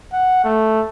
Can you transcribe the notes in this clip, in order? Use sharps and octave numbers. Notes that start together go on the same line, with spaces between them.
F#5
A3